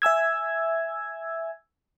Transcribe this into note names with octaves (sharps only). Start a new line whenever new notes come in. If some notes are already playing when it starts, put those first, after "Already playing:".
E5 G#5 E6 G#6